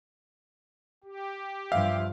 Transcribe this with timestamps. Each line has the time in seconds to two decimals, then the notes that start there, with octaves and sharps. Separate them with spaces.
1.04 G4
1.72 G2 F3 E5 F5